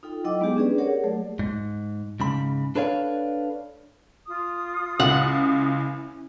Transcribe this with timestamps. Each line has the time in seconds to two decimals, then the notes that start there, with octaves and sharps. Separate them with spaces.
0.03 D#4 F4 A4 G5
0.24 F#3 E4 D#5 G5 D6
0.40 G#3 B3 D#4 G4 G#4
0.56 C#4 D4 G#4 B4 D5
0.78 G4 G#4 A#4 C#5 F#5
1.04 F#3 A3 D5
1.39 G#2
2.20 G#2 C#3 B5
2.75 D4 A4 B4 C#5 D5 F5
4.27 F4 D#6
5.00 C#2 C#4 E4 F#5